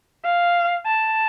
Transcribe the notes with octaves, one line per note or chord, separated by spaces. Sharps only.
F5
A5